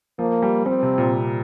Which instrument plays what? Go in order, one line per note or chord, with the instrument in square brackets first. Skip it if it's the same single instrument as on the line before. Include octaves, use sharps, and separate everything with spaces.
[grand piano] F3 [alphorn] A#3
[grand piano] G3
[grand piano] G3 [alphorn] C4
[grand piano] C3
A#2